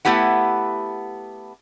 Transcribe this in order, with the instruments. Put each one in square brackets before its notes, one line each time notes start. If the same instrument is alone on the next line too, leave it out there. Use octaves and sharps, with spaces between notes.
[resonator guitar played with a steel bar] A3 B3 E4 G4 F#5